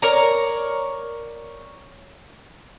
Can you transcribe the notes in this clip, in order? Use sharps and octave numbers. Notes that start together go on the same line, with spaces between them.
A#4 C#5 D5 A#5